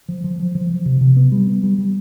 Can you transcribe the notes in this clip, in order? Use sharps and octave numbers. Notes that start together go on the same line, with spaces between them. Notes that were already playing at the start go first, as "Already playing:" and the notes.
F3
F3
F3
F3
F3
C3
C3
B3
G3
B3
G3
G3